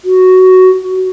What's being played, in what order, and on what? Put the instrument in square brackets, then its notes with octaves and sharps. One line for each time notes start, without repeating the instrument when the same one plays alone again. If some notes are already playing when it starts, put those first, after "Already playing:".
[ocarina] F#4